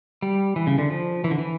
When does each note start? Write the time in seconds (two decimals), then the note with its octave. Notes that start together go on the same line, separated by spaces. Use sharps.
0.22 G3
0.56 E3
0.67 C#3
0.78 D3
0.90 F3
1.24 E3
1.31 D3
1.39 E3